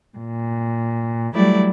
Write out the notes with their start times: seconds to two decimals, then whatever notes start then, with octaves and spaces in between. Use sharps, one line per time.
0.17 A#2
1.34 F#3 G3 A3 E4 D5